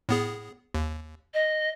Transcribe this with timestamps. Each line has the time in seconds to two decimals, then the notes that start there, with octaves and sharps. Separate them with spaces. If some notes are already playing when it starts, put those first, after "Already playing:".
0.09 A2 B3 G#4
0.74 D#2
1.34 D#5